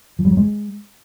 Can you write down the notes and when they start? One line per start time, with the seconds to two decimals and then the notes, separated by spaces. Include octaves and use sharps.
0.19 F3
0.25 G3
0.31 F#3
0.37 G#3